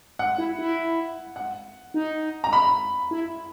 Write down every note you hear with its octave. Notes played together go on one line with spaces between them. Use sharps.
F#5
E4
E4
F#5
D#4
A#5
B5
E4